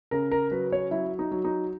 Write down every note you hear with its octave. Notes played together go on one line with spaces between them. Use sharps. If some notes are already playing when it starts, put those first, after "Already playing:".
C#3 A#4
A#4
F#3 B4
C#5
F#3 E4
D#4
F#3
D#4